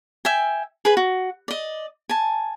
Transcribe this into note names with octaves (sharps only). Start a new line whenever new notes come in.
E5 G5 G#5
G#4 B4 B5
F#4
D5 D#5
G#5 A5